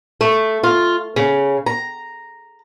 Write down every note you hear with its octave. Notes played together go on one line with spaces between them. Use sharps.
A3
F4
C#3
A#5